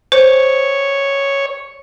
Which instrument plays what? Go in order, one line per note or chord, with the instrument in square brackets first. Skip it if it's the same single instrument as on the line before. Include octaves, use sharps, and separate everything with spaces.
[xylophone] C5 [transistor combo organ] C#5